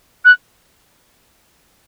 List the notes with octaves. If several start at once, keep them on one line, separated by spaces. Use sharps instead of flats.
F#6